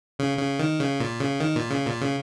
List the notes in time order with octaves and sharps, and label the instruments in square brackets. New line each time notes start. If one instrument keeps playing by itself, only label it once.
[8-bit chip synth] C#3
C#3
D#3
C#3
A#2
C#3
D#3
A#2
C#3
A#2
C#3